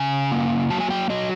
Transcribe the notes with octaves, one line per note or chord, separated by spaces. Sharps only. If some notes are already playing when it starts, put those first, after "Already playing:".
Already playing: C#3 G#5
A#3
F#3 A5
G#5
G5
F#3 D#5